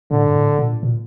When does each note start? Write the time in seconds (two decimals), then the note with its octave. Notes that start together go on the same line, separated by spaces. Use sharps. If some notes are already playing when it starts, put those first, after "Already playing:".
0.11 A2 D3
0.26 G2
0.35 A2
0.59 A#2
0.83 A#2